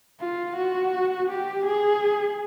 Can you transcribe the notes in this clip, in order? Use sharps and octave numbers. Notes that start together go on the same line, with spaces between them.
F4
F#4
G4
G#4